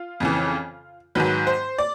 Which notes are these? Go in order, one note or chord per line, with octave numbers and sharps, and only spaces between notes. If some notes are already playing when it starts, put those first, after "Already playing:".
Already playing: F4
F2 C#3 E3
G#2 D#3 F#3 B4
C5
D5